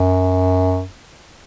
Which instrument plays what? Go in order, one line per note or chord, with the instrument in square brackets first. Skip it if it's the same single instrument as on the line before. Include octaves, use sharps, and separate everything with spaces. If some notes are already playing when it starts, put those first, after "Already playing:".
Already playing: [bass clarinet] F#2